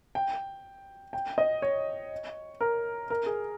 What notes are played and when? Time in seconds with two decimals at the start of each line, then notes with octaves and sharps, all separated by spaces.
0.15 G5
1.13 G5
1.38 D#5
1.62 C#5
2.61 A#4
3.10 A#4
3.26 G#4